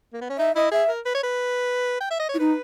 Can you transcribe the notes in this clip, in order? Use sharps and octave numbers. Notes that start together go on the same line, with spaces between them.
A#3
B3
C#4
D#4 E5
E4 D#5
G#4 E5
A#4
B4
C#5
B4
G5
E5
D#5
C#5
E4
D#4 B4